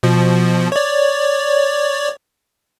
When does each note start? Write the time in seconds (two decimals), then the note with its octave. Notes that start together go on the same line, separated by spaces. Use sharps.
0.03 B2 F3
0.72 C#5 D5